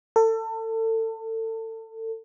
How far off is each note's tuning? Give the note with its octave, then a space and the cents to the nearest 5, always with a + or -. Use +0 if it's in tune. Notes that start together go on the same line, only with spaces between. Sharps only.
A4 +30